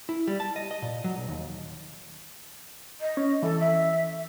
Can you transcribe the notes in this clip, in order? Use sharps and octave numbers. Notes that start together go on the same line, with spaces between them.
E4
G3
A5
D#5
D#5
A#2
F#3
B1
D#2
D#5
C#4
E3 A4
E5